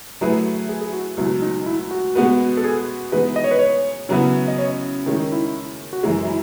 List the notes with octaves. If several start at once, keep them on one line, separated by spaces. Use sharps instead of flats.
F#3 A3 E4 G#4 B4
G#4
G#4
F#4
C#2 B2 F#3 E4
D#4
E4
F#4
B2 G#3 B3 F#4 B4
A4
G#4
E3 G#3 B3 D#4 G#4 B4
D#5
C#5
B4
C#5
C#3 F#3 B3 E4
D#5
C#5
D#3 G#3 C#4 E4
D#4
E4
F#4
F#2 E3 G#3 E4
E4